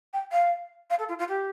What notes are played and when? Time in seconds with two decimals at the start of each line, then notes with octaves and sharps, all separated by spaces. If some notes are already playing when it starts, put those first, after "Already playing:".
0.13 G5
0.32 F5
0.90 F5
0.99 A4
1.09 F4
1.19 F4
1.28 G4